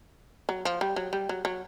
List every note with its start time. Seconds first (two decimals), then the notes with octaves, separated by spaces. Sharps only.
0.49 F#3
0.65 F3
0.81 G3
0.96 F#3
1.13 G3
1.29 F#3
1.45 F#3